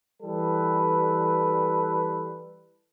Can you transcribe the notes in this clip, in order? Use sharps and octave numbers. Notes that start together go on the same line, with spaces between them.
E3 G3 A4 B4